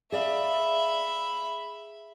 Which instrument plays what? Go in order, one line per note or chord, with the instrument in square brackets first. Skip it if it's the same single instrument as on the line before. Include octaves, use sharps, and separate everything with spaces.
[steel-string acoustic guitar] G#4 D5 F5 [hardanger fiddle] E5 B5